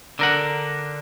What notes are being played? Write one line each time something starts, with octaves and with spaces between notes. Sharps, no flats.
D3 A#4 F#5